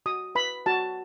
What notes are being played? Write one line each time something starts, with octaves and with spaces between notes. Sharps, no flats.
F#4 D#6
B4 B5
F#4 A5